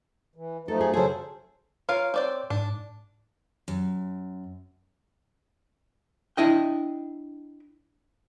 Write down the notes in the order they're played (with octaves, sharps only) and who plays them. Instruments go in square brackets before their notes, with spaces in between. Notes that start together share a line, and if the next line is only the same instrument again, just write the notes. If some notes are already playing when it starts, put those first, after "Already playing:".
[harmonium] E3
[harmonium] F3 A3 D#4 [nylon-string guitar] A4
[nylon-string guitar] G#4
[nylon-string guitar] C#3 G#4 [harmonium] F#3 A4 C5
[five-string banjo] F4 A#4 F5 [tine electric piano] C#5
[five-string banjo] C4 D5 G5
[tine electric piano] G#2 [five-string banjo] D4
[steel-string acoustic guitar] F#2
[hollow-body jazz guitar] D4 E4 D#5 G5